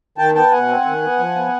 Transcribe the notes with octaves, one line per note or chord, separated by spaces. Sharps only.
D#3 G5 A5
B3 G5 A5
B2 F#5 G#5
C4
D#3
B3
F3
B3